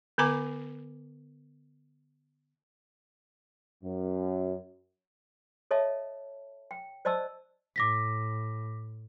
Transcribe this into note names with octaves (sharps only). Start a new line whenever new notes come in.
D3 B3 B4 G#5 A#5 D6
F#2
A4 C#5 D#5 E5 A5
G5
C5 D5 D#5 A5 E6
A2 D6 A#6 B6